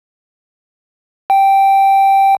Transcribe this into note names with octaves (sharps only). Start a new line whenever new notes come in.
G5